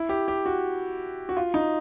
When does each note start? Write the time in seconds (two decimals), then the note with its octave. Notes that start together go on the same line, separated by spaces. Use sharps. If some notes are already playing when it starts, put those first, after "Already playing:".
Already playing: E4
0.09 G4
0.28 G4
0.46 F#4
1.29 F#4
1.37 F4
1.54 D#4